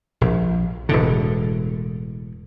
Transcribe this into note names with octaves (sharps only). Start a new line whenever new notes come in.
A#1
E1 A2 D3